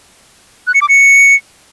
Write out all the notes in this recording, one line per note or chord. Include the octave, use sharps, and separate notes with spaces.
F#6
C#7
D6
C#7